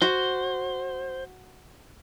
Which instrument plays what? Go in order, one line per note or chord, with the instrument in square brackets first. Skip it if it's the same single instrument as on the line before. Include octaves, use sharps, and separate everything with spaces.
[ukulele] F#4 [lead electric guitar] C5